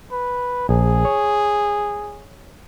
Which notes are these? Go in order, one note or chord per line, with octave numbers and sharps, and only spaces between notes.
B4
A#1 G#4
C#5